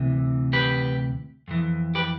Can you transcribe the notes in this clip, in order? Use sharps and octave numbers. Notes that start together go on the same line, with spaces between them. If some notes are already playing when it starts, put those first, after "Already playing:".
Already playing: D2 C3 E3
G4 B4
F2 E3
G4 B4